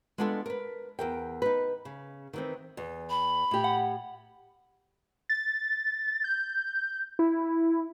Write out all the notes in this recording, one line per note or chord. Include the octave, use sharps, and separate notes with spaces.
G#3 B3 D4 F4 G#4 A4
A#4 B4
E2 A#4 G5
D#4 B4
C#3
D#3 E3 C4
E2
B5
A2 G4
F#5
A6
G6
E4